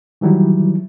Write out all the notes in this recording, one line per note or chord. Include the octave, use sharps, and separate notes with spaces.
D#3 E3 F#3 G3 E4